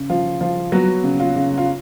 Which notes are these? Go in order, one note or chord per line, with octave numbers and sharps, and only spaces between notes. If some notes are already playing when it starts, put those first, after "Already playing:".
Already playing: C#3
F3 F4
F3 F4
F#3 B3 F#4
C#3
F4
C#3
F4